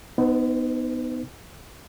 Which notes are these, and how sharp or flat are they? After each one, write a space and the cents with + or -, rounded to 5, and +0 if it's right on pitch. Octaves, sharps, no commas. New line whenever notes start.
B3 +10 D#4 +0 C5 -40